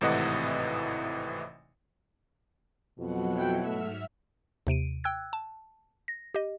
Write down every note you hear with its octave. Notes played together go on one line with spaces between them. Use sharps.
G#1 A2 C3 E3 D#5 F#5
F2 B2 F#3 F#5
E4 G5
G#2 A3 E5 F6
D#2 C3 D7 D#7
G5 E6 F#6 G#6
A5
A#6
G4 D#5